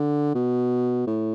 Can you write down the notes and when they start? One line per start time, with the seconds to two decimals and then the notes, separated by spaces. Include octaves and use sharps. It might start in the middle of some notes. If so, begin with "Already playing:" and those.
Already playing: D3
0.35 B2
1.07 A2